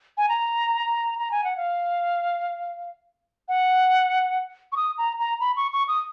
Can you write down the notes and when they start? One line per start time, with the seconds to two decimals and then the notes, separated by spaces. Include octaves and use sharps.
0.17 G#5
0.29 A#5
1.18 A#5
1.31 G#5
1.44 F#5
1.57 F5
3.48 F#5
4.72 C#6
4.76 D#6
4.98 A#5
5.19 A#5
5.40 B5
5.56 C#6
5.72 C#6
5.88 D#6